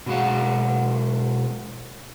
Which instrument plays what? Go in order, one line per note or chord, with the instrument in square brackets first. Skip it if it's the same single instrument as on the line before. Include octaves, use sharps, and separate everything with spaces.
[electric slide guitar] B2 F#3 G#3 F5 F#5